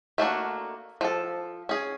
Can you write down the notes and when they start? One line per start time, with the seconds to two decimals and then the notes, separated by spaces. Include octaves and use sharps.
0.18 A3 A#3 D4 F#4
1.01 F3 A4
1.69 C#4 G#4